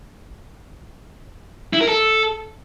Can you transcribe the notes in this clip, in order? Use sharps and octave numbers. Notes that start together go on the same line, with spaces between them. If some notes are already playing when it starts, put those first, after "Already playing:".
E4
A#4
A4